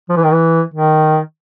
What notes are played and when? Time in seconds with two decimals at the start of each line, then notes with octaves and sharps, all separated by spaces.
0.09 F3
0.17 E3
0.24 D#3
0.33 E3
0.74 D#3